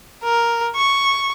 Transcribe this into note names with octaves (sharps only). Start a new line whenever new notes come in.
A#4
C#6